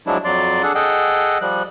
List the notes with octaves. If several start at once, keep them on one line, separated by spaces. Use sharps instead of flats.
F3 F#3 G#3 D4 E4
F2 F#3 D5 C6
D4 G#4 A4 F#5
G#4 A4 D#5 F#5 G5
F3 G3 F#6